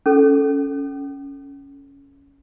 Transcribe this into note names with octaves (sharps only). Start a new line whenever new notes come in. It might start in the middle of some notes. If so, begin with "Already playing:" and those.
C#4 A4